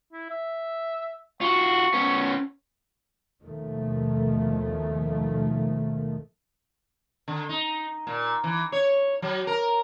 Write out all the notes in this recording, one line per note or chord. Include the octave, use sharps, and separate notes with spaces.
E4
E5
F4 F#4 C#6
B3 C#4
D#2 B2 D#3 F3 A3
D3
D#4
A#2
E3
C#5
F#3
A#4